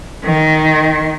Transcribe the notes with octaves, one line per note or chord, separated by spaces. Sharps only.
D#3